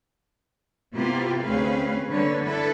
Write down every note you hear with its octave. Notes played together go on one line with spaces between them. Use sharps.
C3 A#3 B3 E4 F4 G4
D2 C4 C#4 G#4 B4 F5
D3 G3 A#3 B4 C#5
D4 E4 A4 B4